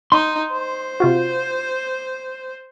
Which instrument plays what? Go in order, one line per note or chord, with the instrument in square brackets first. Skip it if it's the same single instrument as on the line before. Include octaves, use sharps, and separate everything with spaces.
[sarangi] D#4 [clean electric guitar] C6
[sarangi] C5
[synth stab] C3 F4 F#4